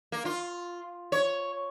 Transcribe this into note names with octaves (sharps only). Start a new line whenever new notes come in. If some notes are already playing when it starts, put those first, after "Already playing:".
A#3
F4
C#5